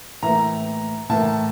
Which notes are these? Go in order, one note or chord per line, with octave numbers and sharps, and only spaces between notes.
A2 E3 A#3 A#5
A2 E3 A#3 A5